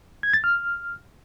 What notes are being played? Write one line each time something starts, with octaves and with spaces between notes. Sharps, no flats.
G#6
A6
F6